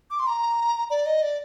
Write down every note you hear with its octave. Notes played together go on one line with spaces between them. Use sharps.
D6
C6
A#5
D5
D#5
D5